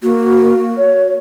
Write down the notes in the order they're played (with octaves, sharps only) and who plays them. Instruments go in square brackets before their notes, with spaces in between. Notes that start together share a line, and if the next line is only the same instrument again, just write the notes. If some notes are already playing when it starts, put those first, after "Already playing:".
[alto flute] A#3 [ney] F#4
[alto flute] C#5